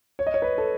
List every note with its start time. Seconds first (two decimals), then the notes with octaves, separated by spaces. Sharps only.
0.19 C#5
0.27 D#5
0.34 C#5
0.42 B4
0.58 A4